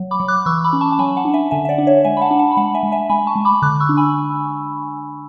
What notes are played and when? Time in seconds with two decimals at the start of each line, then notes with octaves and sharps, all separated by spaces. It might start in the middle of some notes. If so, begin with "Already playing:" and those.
Already playing: F#3
0.11 B5 D6
0.20 F#3
0.28 D6 F#6
0.46 E3 C#6 E6
0.64 B5 D6
0.73 C#4
0.81 A5 C#6
0.92 A5
0.99 F#3 G#5 B5
1.17 F#5 A5
1.25 D4
1.33 E5 G#5
1.51 D3 E5 G#5
1.65 E5
1.69 D5 F#5
1.78 D4
1.87 C#5 E5
2.04 G#3 E5 G#5
2.17 B5
2.21 F#5 A5
2.31 D4
2.39 F#5 A5
2.52 B5
2.57 G#3 F#5 A5
2.74 E5 G#5
2.83 G#3
2.92 E5 G#5
3.09 G#3 G#5 B5
3.27 A5 C#6
3.35 G#3
3.45 B5 D6
3.62 D3 D6 F#6
3.80 C#6 E6
3.89 D4
3.97 G#5 B5